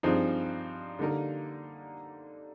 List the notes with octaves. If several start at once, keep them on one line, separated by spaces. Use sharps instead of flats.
G2 F3 C4 D#4 G#4
D3 G3 A#3 D#4 A#4